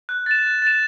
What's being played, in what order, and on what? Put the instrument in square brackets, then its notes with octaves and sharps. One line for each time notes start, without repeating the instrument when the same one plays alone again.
[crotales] F#6
A6 E7
F#6
A6 E7